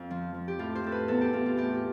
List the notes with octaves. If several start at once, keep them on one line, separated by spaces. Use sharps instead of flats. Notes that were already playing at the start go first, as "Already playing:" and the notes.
Already playing: F2
F3
F3
G4
A2 F4
C5
A2 A4
B4
E2 A4
G4
E2 F4
F4
A2 G4